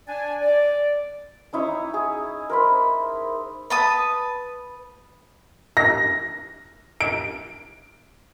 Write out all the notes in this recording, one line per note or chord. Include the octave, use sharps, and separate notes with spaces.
D4 D5 G#5
D5
C#4 D#4 E4 C#5
G#4
A#4 C5 B5
B4 A5 D#6
A#6
D7